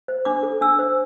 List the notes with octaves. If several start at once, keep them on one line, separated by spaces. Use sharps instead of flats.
C5
D4 D6
A4
D4 E6
C5